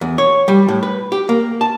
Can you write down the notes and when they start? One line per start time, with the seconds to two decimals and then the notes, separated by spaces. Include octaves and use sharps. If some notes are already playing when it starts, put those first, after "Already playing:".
0.01 E2
0.18 C#5
0.48 G3
0.69 A2
0.83 B4
1.12 G4
1.29 A#3
1.61 A5